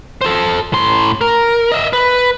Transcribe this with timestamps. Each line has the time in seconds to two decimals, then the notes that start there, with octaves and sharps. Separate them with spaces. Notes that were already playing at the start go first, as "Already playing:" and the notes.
0.21 A4 C5
0.73 A2 C6
1.21 A#4
1.72 D#5 E5
1.93 B4